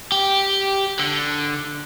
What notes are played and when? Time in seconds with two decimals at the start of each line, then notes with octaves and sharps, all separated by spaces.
0.12 G4
1.00 D3